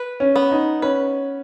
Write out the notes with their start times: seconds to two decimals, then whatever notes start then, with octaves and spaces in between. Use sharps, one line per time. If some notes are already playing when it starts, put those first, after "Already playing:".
Already playing: B4
0.20 C#4
0.36 B3
0.51 D#4
0.82 C#4 B4